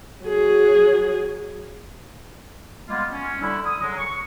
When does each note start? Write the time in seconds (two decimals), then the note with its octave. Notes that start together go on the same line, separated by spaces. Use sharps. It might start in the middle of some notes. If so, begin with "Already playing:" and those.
0.25 F#3 G#4
2.87 G3 G#3 A#3 B3 F4
3.11 C#4
3.41 D3 G3 D4 E4
3.65 D#6
3.81 D3 F#3 G#3
3.97 C#6